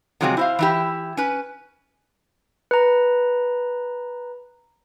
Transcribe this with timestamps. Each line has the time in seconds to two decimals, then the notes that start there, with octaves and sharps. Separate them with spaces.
0.21 C3 F3 F#3 G#3 B3 C4
0.37 E4 C5 F5
0.59 E3 E4 G4
1.17 C#4 B4
2.71 B4 A#5